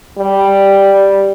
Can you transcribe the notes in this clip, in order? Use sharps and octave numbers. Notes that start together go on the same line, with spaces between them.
G3